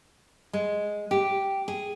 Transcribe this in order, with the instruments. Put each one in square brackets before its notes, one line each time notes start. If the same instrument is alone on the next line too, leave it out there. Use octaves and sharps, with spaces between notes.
[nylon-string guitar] G#3
G4
G#4